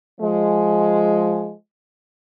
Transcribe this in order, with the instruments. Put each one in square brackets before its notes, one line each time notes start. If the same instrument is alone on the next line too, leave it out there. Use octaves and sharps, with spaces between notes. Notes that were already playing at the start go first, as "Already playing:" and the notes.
[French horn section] F3 G#3